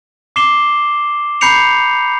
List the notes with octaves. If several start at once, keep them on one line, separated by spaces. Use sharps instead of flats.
D6 C7 E7 G7
A#5 B5 G6 C7 C#7 F7